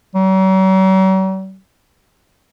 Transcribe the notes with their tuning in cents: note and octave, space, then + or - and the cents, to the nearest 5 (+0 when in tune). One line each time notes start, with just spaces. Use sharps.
F#3 +45